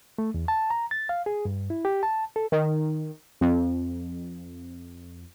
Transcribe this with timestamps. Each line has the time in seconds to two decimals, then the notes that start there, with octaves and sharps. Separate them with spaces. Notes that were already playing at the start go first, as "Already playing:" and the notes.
0.18 A3
0.34 E2
0.48 A5
0.70 A#5
0.91 A6
1.09 F5
1.26 G#4
1.45 G2
1.70 E4
1.85 G4
2.03 A5
2.36 A4
2.52 D#3
3.41 F2